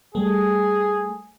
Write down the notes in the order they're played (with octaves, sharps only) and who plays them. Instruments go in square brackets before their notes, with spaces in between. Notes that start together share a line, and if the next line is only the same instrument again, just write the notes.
[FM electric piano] G3 A3 [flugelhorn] G#4